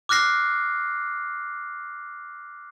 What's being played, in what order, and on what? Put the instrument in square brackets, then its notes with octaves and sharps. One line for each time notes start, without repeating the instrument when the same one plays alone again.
[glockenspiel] D6 F6 F#6 A#6 C7